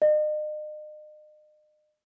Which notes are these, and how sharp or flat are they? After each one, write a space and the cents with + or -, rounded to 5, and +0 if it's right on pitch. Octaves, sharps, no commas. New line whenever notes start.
D#5 -40